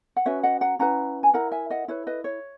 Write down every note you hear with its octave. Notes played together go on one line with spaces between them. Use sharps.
F#5
C#4 F#4 B4 C#5 E5
D#5 F#5
F#5 A#5
C#4 E4 B4 F#5 A#5
G#5
E4 A#4 F#5 A#5
E5 G#5
D#5 F#5
E4 B4 C#5
B4 D#5
C#5